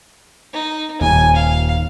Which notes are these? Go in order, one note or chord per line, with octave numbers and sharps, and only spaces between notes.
D#4
D#1 G#1 D#2 G#5
F5